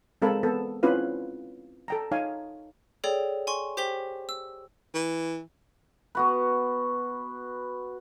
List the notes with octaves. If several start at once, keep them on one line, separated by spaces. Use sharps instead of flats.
G#3 C4 A4 A#4 F5 B5
B3 A4
C4 C#4 E4 F4 B4 F5
A4 G5 A#5
D#4 C#5 F5 G#5
G#4 A4 C#5 D5 G5
G#5 C6 C#6
G4 C5 G5 B6 F7 G7
E6
E3
B3 F#4 B4